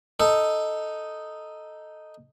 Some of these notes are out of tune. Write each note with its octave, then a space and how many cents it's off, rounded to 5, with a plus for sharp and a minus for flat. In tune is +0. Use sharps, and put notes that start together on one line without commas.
D#4 +0 A4 +0